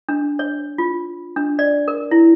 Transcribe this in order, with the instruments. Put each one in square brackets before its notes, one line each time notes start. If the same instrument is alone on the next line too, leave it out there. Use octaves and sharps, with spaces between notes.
[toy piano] D4
C#5
F4
D4
D5
A#4
E4